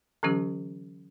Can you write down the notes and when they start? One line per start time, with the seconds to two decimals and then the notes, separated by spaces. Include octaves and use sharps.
0.23 D3 E3 F#3 C#4 G4